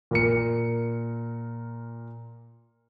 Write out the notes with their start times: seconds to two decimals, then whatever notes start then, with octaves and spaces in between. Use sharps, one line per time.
0.11 A#2 A#4 C#7